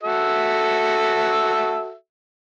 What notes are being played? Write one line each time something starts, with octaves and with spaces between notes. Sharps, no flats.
F#4 A4 E5